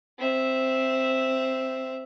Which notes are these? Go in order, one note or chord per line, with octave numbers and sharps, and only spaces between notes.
C4 E5